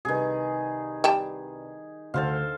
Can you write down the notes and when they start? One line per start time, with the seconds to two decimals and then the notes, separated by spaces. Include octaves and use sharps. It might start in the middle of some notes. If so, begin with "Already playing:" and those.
0.05 C2 D#3 G#4 B4
1.04 G3 G5 A5
2.14 D2 A4 C5 F5